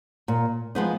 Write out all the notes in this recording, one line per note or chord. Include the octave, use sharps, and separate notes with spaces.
A#2
F3 G#3 B3 D#4